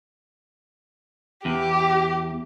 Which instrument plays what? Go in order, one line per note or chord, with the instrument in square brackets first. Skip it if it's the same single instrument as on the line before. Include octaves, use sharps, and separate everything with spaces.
[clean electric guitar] E2 [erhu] G4